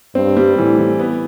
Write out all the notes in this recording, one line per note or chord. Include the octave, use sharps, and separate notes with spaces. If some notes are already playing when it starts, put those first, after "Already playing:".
G2 C4
G3
A2 E3
E3
B3